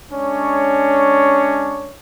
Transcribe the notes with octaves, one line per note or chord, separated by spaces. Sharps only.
G#3 C#4 D4 C#5